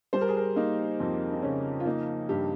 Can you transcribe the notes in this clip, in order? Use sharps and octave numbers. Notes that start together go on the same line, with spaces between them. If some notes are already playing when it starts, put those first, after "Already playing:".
G3 C5
A#4
G#4
A#4
A#3 D#4
F2 C4
D#4
C#3 C#4
F4
A#3 D#4
G2 G4